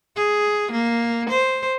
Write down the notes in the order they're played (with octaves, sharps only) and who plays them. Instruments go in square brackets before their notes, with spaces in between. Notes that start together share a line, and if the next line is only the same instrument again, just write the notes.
[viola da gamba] G#4
A#3
C5